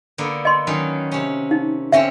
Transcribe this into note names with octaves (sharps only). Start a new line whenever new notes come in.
D3 A#3 B3
D#5 C6
D#3 F#3 C#4
C3 C#4
D#4
D3 C4 C#4 E5